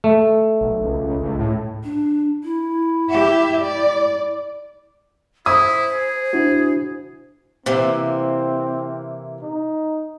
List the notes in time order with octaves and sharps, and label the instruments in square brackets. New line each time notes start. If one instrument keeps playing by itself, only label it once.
[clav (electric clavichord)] A3
[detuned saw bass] B1
C#2
C#2
A2
[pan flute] D4
E4
[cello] G4 E5
D5
[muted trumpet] E4 [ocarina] C5 [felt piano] D#6
[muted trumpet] G#4
[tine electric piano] D4 E4 F#4
[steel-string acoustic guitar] C3 E3 A#3 [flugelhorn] C4
[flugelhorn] D#4